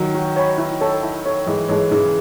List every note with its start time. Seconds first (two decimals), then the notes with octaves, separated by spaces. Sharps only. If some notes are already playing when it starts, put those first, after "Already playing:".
Already playing: D#3 F#3
0.15 F#4
0.36 C#5 G#5 B5
0.58 E4
0.81 A4 C#5
1.03 E4
1.26 A4 C#5
1.47 E3 G#3 E4
1.69 E3 G#3 A4 C#5
1.91 C#3 E3 E4